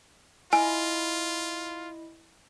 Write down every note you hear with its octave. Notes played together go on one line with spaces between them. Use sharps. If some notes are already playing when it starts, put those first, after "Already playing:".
E4 F4 D#5 G#5